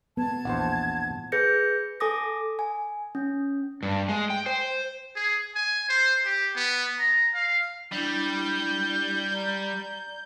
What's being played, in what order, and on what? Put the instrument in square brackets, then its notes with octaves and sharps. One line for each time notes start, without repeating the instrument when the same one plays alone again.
[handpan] B3 [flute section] A5 G#6
[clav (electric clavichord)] A#1 E2 C5 [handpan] F#5
[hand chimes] G#4 B4 G6 A#6 C#7
A4 G#5 D6 D#6 A#6
G#5
C#4
[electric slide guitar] G2
G#3
G5
C5
[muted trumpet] G#4
G#5
C5
G4
B3
A#5
F5
[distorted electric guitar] G3 [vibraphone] D4 E4 [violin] G6
[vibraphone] D5 A#5